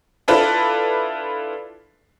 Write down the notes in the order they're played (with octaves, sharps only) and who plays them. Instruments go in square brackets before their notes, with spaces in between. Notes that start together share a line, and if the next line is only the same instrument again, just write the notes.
[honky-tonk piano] D4 E4 F4 A4 B4 D5